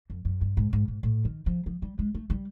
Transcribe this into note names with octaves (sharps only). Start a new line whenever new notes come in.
F2
F#2
G2
G#2
G#2
G#2
A2
D#3
F3
F3
G3
G#3
A3
G3